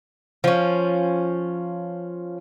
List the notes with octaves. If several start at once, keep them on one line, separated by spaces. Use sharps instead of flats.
F3 C#4